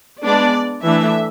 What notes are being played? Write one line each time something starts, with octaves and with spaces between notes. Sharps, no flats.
G#3 B3 D4 D5
E3 A3 D4 E5